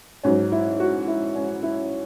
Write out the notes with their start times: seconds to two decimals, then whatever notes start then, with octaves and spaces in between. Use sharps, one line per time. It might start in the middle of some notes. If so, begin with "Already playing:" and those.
0.23 G#2 F#3 C#4
0.52 E4
0.80 F#4
1.07 E4
1.35 C#4
1.63 E4